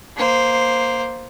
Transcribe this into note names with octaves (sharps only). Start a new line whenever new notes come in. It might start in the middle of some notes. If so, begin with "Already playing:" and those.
A#3 C5